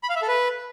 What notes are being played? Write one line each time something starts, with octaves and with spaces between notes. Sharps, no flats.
B5
F5
E5
A4
B4